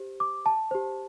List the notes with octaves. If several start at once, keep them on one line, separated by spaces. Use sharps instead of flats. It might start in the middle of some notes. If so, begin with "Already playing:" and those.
Already playing: G4 C5
D6
A5
G4 C5